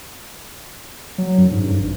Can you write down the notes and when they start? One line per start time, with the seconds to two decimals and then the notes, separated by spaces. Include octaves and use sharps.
1.18 F#3
1.38 F#2
1.51 G#2
1.64 G2
1.79 G#1